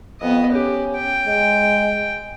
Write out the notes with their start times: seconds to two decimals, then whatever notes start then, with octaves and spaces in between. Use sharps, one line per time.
0.21 F2 B3 D#5
0.52 C#4 G4
0.97 G5
1.27 G#3